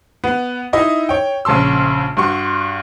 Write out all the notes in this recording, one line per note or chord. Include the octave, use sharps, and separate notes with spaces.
B3
D#4 E4 D#5 D#6
C#5 G5
A#1 C#3 A5 C6 E6
G2 F#4 C6 C#6